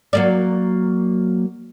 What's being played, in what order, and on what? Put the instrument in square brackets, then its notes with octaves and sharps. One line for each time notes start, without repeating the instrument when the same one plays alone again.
[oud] F#3 A#3 D5